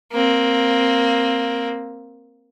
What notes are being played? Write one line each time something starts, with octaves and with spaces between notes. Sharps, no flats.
A#3 C4